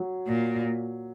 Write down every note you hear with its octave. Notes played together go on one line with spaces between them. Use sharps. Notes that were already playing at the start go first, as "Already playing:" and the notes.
Already playing: F#3
A#2